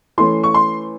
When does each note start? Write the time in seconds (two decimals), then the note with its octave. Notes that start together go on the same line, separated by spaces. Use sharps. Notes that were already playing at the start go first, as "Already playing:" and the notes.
0.18 E3 A3 C#4 C6
0.43 C#6
0.54 C6